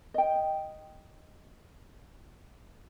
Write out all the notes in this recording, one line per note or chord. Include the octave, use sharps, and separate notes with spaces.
D#5 G5